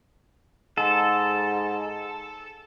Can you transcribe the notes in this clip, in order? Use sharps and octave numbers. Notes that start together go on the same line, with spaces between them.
G#2 A4